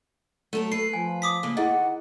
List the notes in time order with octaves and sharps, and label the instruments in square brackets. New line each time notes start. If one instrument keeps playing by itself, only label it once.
[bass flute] F#3 [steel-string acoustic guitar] A3 A4 A#4
[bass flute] A4 [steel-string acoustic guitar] B4 [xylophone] C7
[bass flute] F3 [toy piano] G#5
[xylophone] D6 D#6 B6
[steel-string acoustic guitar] A2 C#3 A#3
[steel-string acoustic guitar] D#3 [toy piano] E4 G#4 D#5 [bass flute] F#5